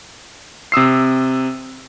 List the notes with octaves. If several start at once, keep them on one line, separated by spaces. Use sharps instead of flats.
C3 D#6 E6 C7